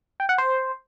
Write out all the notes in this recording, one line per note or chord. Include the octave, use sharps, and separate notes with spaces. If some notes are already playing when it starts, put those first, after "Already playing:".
G5
F#5
C5